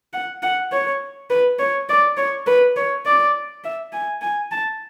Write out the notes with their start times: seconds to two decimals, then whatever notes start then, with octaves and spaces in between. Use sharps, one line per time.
0.13 F#5
0.42 F#5
0.72 C#5
1.30 B4
1.59 C#5
1.89 D5
2.17 C#5
2.46 B4
2.76 C#5
3.06 D5
3.64 E5
3.92 G#5
4.22 G#5
4.52 A5